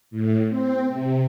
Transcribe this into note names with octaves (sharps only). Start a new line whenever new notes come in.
A2
C4
C3